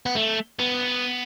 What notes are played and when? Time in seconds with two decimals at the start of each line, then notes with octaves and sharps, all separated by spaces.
0.06 B3
0.15 A3
0.60 B3